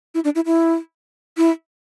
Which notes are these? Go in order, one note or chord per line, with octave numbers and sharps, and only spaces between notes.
E4
D4
E4
E4
E4